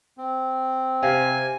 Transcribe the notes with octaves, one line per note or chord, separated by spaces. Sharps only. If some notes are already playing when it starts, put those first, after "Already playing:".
C4
C3 F5 G#5